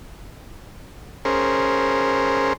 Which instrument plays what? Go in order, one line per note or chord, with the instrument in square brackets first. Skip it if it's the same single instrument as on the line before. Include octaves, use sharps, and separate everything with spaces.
[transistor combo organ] C#4 G#4 A#4 C5